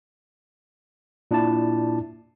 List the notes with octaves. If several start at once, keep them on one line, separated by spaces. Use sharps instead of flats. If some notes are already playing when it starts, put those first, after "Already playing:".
A#2 D4 E4 D5 A5